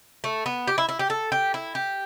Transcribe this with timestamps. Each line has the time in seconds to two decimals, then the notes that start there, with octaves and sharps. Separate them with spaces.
0.24 A3
0.46 B3
0.67 G4
0.78 E4
0.89 E4
0.99 G4
1.10 A4
1.32 G4
1.54 E4
1.75 G4